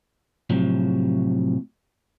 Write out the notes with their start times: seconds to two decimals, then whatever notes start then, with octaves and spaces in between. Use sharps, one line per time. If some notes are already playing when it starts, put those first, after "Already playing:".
0.50 A2 C3 F3 F#3